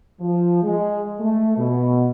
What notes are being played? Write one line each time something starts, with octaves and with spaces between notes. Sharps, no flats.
F3
G#3
A3
B2